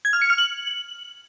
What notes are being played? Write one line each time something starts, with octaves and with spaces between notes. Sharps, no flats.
G#6
F6
C#7
F6
F#7